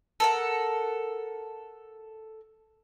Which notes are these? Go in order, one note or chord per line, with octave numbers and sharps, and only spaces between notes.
A4 A#4 F#5